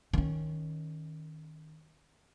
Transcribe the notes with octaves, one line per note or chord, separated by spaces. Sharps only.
D#3 C#4